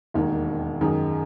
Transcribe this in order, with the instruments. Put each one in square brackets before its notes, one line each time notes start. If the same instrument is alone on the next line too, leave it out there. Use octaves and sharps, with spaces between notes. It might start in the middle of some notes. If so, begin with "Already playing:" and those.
[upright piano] E1 D#2 D#3
F#2 D#3 G#3 D#4